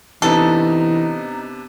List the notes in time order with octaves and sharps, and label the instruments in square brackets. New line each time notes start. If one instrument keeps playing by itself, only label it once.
[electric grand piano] C3 B3 D4 [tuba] E3 [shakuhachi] D#4 [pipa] A4